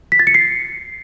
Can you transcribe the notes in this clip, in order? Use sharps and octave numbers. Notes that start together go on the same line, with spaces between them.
B6
A6
C#7
C7